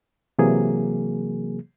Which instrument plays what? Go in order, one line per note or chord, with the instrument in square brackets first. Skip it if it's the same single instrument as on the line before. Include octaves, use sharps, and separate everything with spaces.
[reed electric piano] C3 E3 F#3 A#3 G#4